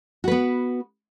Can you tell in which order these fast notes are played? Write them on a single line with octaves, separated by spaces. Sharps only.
F#4 B4 B3